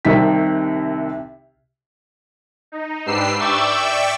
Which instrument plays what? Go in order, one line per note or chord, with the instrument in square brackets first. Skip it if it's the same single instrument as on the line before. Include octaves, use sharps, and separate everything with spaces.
[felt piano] C2 C3 D#3 B6
[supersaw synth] D#4
G#2 D4 G4 B4 E6 C7
D5 E5 G5 C#6 D6 E6